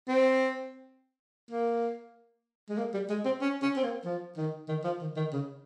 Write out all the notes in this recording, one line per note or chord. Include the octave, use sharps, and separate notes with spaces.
C4
A#3
G#3
A#3
G3
G#3
C4
C#4
C#4
C4
A#3
F3
D#3
D#3
F3
D#3
D#3
C#3